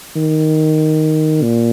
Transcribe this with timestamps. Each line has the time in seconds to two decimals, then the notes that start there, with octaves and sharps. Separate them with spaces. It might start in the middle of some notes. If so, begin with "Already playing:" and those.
0.16 D#3
1.42 A#2